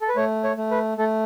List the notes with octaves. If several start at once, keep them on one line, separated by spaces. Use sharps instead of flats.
A4
B4
A3 C#5
C#5
A3
B4
A3 A4